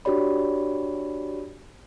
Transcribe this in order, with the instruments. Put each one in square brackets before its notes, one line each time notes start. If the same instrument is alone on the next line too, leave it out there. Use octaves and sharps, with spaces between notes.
[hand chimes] D4 F#4 G4 C#5 D5 B5